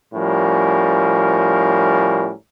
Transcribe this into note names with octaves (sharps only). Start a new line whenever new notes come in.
A2 F3 G3 C#4 A#4